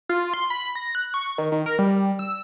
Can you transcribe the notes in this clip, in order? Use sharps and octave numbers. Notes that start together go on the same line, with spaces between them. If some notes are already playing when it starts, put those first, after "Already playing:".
F4
C6
B5
A#6
F#6
C#6
D#3
D#3
A#4
G3
E6